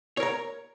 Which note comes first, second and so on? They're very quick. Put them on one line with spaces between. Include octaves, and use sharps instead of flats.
C#5 A#4 A#5